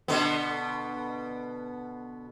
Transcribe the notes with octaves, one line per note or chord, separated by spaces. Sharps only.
B2 D3 B3